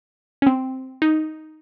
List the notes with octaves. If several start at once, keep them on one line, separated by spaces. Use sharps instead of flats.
C#4
C4
D#4